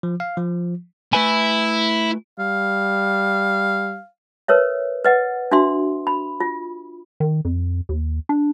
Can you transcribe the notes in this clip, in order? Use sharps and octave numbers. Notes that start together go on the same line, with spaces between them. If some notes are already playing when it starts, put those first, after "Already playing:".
F3
F5
F3
A3 E4 B4 G#5
G3 F5
A#4 B4 C#5 E5
B4 D#5 F#5
D4 F#4 E5 C6
B5
F4
D#3
F2
D#2
D4